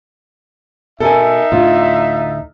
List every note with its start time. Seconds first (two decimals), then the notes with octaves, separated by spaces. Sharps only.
1.00 B2 D#4 A4 A#4 E5 G#5
1.52 D2 A2 D3 F4